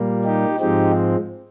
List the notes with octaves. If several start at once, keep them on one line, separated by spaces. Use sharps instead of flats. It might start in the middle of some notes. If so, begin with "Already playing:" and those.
Already playing: A#2 G3 A#3
D#4 G4
G#2 F3 G#3 C4 D#4 G4